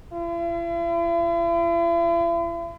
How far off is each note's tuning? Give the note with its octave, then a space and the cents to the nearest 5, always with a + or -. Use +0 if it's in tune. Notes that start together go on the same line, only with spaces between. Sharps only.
E4 +45